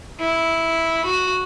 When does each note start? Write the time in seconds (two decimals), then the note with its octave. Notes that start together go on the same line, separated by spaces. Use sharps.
0.21 E4
1.06 F#4